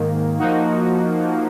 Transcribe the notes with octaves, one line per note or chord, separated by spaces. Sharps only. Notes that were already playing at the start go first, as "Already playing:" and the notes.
Already playing: G#2 D#3 A#3
F3 A#3 D#4 F#4